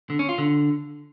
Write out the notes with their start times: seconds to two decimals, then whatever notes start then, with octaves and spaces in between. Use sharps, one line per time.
0.10 D3
0.19 C#4
0.29 F4
0.38 D3